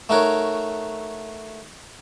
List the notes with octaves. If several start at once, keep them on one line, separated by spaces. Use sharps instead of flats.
A3 D#4 F#4 A#4 C#5